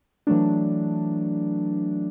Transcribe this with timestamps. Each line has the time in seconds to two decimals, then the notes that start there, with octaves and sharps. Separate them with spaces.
0.27 E3 F#3 A3 D4